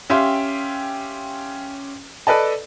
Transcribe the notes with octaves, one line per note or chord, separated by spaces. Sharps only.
C#4 G4 E5 F5 G5 C6
A4 B4 D5 D#5 A5